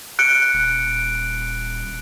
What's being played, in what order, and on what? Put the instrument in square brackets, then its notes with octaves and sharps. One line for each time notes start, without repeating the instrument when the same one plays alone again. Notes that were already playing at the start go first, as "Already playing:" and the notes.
[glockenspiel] F#6 C#7 D7
[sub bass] D#1